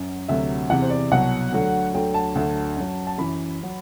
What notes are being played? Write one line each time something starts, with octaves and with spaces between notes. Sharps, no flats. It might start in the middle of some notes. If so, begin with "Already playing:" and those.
Already playing: F#2 F#3
D2 C3 F#3 E5
E2 C3 E3 F#5
C5
D5
C2 B2 F#3 F#5
D2 D3 F#3
D2 D3 F#3 G5
A5
D2 D3 F#3
F#2 F#3
A5
F#2 E3 B5
F#3